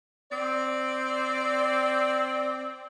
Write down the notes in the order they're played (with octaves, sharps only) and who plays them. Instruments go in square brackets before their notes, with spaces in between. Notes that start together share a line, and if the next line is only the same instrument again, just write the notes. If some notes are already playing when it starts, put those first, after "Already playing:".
[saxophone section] C4 D5